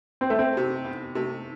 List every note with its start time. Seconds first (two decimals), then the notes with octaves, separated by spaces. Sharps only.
0.21 E2 C4
0.30 A3
0.39 C4
0.53 C3 A3
0.84 E2
1.15 C3 A3